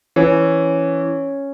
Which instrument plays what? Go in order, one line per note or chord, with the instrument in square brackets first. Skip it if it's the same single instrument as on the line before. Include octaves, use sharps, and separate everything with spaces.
[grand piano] E3 [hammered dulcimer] C#4